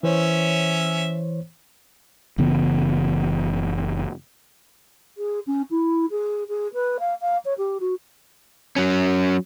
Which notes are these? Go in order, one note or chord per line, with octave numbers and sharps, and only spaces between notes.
E3 C#4 C5 C#5 E5
F#1 C#3 E3 B3
G#4
C#4
E4
G#4
G#4
B4
F5
F5
C#5
G4
F#4
F#3 C#4